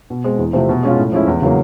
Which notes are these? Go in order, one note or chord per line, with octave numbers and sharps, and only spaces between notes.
B2
G#3 C4
E2
C3 F3 A3 C4
B2
G#3 C#4 F4
A2
F3 G#3 C#4 E4
E2
C#3 F#3 A#3